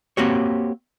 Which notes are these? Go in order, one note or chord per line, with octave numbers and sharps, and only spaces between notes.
A#3 C4 F#4 G4 C#5